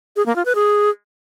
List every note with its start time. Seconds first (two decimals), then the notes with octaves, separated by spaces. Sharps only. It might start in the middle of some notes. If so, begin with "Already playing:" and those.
0.16 G#4
0.26 A#3
0.36 F4
0.45 B4
0.55 G#4